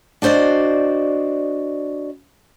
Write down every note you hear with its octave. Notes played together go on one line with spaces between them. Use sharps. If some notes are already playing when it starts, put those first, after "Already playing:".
D4 F#4 C5 D5 D#5